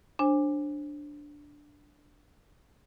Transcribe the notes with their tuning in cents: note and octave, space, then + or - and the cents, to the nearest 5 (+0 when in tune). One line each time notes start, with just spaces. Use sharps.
D4 +0 C5 +30 G#5 -20